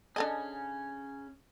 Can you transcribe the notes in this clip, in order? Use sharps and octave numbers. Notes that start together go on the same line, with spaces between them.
C#4 D4 G#4 A4 D#5